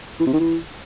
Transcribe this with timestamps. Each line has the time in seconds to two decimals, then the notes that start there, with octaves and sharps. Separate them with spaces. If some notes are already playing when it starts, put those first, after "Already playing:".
0.20 E3
0.27 C3
0.33 D#3
0.40 E3